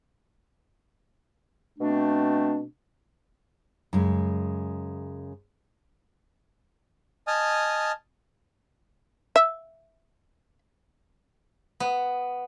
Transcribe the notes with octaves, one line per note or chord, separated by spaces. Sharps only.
B2 A3 C4 D4
F#2 C#3 G#3
D#5 G#5 A5 D#6 F6
E5
B3